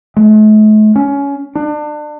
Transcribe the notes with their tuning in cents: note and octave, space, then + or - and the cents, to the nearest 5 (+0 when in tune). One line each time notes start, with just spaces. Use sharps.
A3 -45
C#4 +20
D4 +30